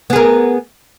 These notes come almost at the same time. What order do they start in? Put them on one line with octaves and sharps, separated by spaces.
B3 G#4 A#4